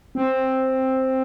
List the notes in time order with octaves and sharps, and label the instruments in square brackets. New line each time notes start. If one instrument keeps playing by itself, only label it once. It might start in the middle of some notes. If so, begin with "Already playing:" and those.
[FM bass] C4